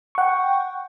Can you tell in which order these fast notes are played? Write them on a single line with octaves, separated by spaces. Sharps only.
C#6 F#5 G5